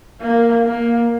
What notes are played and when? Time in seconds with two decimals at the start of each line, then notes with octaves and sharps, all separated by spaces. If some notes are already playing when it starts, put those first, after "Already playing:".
0.21 A#3
0.66 A#3